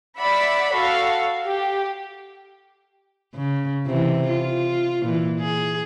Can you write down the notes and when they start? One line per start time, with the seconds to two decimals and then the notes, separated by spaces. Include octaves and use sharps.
0.19 D5 E5 F#5 B5
0.73 F#4 A4 F5
1.47 G4
3.35 C#3
3.86 C3 E3
4.28 F4
5.01 A#2 E3
5.40 G#4